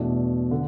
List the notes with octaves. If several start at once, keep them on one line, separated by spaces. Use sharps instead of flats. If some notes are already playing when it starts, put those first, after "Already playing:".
Already playing: E2 B2 A3 D4
D3